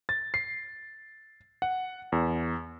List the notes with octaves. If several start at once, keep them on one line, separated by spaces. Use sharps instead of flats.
A6
C7
F#5
E2